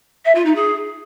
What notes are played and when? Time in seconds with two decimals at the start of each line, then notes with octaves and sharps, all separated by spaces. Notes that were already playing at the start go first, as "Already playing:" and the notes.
0.25 E5
0.35 F4
0.45 D#4
0.55 G#4